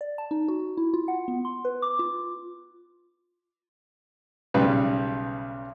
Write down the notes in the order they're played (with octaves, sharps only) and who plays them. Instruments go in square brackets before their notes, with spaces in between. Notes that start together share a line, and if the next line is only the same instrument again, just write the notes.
[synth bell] D5
A5
D#4
F#4
E4
F4
F#5
B3
C6
B4
D6
F4
[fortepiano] B1 C#3 G3 B4